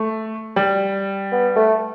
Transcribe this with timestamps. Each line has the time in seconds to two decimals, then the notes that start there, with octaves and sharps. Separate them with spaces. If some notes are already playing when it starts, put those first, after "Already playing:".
Already playing: A3
0.56 G3
1.32 B3
1.56 A3